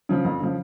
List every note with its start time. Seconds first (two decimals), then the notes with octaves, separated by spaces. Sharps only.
0.09 C#3 F3
0.25 F2
0.40 C#3 F3